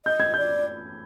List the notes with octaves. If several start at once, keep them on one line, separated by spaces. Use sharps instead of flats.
D#5 G6
G#6
D5 G6